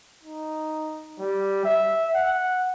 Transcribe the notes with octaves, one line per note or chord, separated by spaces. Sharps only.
D#4
G3
E5
F#5